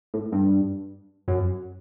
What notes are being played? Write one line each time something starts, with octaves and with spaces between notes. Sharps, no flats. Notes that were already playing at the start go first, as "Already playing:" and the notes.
A2
G2
F#2